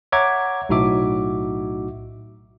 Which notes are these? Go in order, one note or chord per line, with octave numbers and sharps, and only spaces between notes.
C#5 E5 F#5 A#5 D6 G#6
B1 A2 D#4 F#4 E5 D6